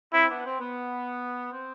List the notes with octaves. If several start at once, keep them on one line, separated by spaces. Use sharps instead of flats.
C4 E4
B3 D4
C4
B3
C4